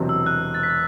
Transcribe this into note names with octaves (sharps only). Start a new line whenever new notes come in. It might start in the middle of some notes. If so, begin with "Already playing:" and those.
Already playing: E1 E2 C3 F#3 C4
E6
F#6
A6
B6
A6